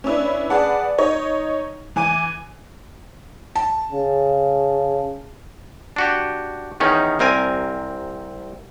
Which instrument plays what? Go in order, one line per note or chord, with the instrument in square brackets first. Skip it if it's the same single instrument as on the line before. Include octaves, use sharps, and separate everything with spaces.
[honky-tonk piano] C#4 D4 E4 B4
G#4 B4 D5 F#5 A5
D#4 C#5 D#5
E3 G#5 D6 D#7
[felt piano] A5
[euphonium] C#3
[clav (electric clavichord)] D4 F#4 G4
E2 D#3 C#4 D#4
C2 C4 A#4 G#5